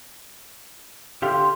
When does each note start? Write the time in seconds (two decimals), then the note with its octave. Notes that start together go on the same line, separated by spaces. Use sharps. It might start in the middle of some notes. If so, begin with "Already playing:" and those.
1.22 D3 G4 F5 C6